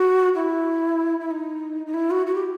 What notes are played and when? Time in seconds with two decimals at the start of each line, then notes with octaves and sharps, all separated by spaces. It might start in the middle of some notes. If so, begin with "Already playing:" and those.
Already playing: F#4
0.35 E4
1.20 E4
1.31 D#4
1.86 D#4
1.94 E4
2.11 F#4
2.26 F#4
2.35 G4